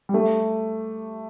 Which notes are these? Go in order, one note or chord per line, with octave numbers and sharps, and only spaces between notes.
G3
A3